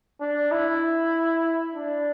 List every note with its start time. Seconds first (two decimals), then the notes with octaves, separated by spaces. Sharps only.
0.20 D4
0.51 E4
1.75 D4